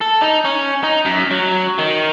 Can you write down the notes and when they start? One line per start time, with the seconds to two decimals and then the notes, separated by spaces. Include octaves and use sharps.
0.01 A4
0.22 D#4
0.45 C#4
0.83 D#4
1.06 F#2
1.31 F#3
1.78 D#3